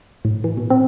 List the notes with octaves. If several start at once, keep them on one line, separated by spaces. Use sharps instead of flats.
A2
E3
B2
C4